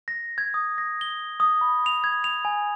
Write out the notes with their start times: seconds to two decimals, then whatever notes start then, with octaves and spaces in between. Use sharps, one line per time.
0.08 A#6
0.38 G#6
0.54 D#6
0.78 A#6
1.01 G7
1.40 D#6
1.61 B5
1.86 F7
2.04 G#6
2.24 F7
2.45 G#5